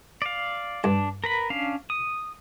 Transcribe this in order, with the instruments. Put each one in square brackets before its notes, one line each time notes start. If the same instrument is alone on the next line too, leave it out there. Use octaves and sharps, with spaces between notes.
[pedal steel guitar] D5 F5
[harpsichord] G2 [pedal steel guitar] D4
[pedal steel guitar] A#4 B4 B5
C#4 D4 F5
D#6